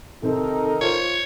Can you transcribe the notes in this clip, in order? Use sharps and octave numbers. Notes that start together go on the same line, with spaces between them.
C3 D#3 C4 D#4 A4 A#4
F4 C5 C#5